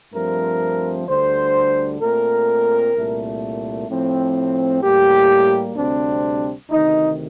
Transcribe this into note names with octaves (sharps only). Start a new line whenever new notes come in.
G2 F3 A3 C4 A#4
D2 D3 G3 C5
A#2 A3 C4 A#4
C2 A#2 A3
A2 F3 C4
A2 G3 A#3 G4
D2 C3 G3 C4 D4
D2 C3 D#3 D#4